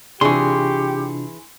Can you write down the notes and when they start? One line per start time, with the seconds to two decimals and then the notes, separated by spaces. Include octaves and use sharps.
0.21 C3 E3 D4 F4 G4 G#4 C6 C#6